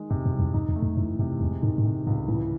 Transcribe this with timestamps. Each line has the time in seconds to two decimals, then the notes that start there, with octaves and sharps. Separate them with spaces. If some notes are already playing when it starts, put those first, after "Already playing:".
Already playing: D#3 G#3
0.10 F#2 C3
0.26 F#2
0.32 C2
0.40 E2
0.54 F#2 D#4
0.69 E2
0.76 A3
0.83 F#2
0.97 F#2 E3
1.19 F#2 C3
1.41 E2 G#3
1.62 G#2 D#3
1.78 G#2
1.84 A2 C3
2.07 C#2 G#2
2.28 A2 E3